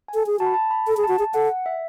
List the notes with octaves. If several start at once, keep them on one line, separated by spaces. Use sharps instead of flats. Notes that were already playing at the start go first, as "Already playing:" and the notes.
G#5
A4
G#4
F#4 A5
B5
A5
B5
A4
G#4
F#4 A5
G#4
A4 F#5
E5